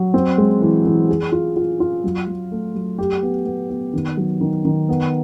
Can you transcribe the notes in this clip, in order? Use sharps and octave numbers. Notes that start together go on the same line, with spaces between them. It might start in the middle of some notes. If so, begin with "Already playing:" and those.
Already playing: F#3
C4
G#3
E3
E3
G#4
F4
F4
F4
F#3
F#3
A3
F#3
G4
B3
B3
B3
D#3
F#3
D#3
D#3
B3